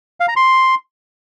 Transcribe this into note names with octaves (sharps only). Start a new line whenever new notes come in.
F5
A#5
C6